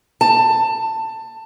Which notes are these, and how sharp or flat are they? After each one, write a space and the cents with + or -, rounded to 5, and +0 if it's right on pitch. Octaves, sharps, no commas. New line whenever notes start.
A5 +20